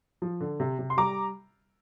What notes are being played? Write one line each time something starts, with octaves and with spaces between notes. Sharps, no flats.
F3
D3
C3
C3
C6
G3 A#5 D6